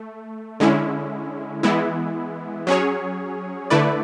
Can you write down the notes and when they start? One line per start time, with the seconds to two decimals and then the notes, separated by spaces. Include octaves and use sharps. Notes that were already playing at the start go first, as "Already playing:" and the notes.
Already playing: A3
0.60 D3 G#3 C#4 E4
1.63 E3 G#3 B3 E4
2.67 F#3 C#4 G#4 C#5
3.70 D3 A3 E4 B4 D5